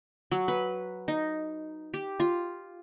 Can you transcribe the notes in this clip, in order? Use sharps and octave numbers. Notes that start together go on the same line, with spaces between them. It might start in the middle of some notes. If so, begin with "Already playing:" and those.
F#3
B4
D#4
G4
F4